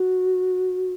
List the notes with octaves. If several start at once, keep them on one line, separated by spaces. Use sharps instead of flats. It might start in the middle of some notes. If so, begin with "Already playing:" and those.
Already playing: F#4